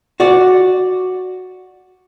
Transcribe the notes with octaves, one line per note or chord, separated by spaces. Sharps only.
F#4 D5